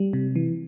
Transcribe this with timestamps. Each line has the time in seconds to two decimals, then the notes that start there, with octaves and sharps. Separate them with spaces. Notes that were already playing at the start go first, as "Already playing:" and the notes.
Already playing: G3
0.13 C3
0.36 E3